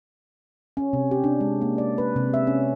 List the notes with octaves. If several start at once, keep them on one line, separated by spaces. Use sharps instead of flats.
C#4
C3
G4
D4
G#3
A#3
D5
B4
C3
E5
C#4